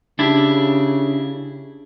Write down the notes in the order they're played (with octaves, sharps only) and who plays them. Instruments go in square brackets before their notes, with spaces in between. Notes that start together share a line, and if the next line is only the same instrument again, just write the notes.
[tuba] C#3 [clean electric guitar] D4 E4 G4